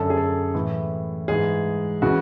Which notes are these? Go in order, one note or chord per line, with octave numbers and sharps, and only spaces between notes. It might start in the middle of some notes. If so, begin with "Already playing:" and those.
Already playing: F#2 D3 A4
G#4
A4
A2 E3
G#2 E3 G#4
C#3 E3 F#4